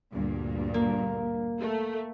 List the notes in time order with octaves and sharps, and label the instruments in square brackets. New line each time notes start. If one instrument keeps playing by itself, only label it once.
[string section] D2 G2 A#2
[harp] A#3
[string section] A3